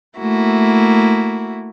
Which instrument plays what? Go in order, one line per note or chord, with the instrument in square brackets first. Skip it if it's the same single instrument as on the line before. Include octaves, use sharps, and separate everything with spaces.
[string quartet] A3 A#3 E4 F#4